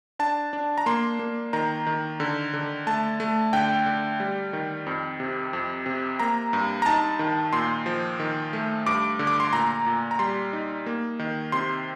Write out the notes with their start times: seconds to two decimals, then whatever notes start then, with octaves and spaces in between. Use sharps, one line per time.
0.19 D4 A5
0.53 D4
0.78 A#5
0.86 A#3 C6
1.19 A#3
1.53 D#3 A#5
1.87 D#3
2.20 D3
2.53 D3
2.87 A3 A5
3.20 A3
3.53 D3 G5
3.86 D3
4.20 G3
4.53 D#3
4.87 F2
5.20 C3
5.53 F2
5.86 C3
6.20 A#3 A#5
6.53 G2
6.82 A#5
6.86 D#4 A5
7.19 D#3
7.53 A#2 C6
7.86 F3
8.20 D#3
8.53 A3
8.86 G2 D6
9.19 D3
9.27 D6
9.40 C6
9.53 A#2 A#5
9.86 A#2
10.11 A#5
10.19 G3 C6
10.53 D#4
10.86 A#3
11.19 D#3
11.52 C3 C6